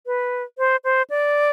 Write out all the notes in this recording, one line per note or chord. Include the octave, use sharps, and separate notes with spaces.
B4
C5
C5
D5